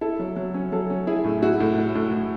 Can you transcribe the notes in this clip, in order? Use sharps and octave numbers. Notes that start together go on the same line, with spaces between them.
E4 A4
F#3
F#3
C#4
F#3 A4
C#4
E4 G#4
A2
E4 F#4
A2
E4
A2
A2